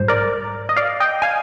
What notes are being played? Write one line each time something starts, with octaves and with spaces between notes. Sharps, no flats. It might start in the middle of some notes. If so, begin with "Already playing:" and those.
Already playing: A#1 G#2 G3 C5
A#4 D5
D#5
D5 F5
D#5 G5
F5 G#5